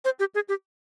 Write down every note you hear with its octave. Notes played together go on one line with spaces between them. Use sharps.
C5
G4
G#4
G4